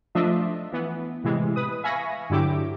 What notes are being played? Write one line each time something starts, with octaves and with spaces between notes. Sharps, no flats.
F3 A3 D4 F4 D#5 E5
E3 B3
A2 C3 E3 G#3
B4 D#6
E5 F5 G#5 B5 C#6 A#6
G2 D3 F#3 E4 G4 D6